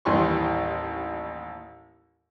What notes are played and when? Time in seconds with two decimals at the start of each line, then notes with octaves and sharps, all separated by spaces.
0.05 A1 D#2 E3 G3 C6 C#6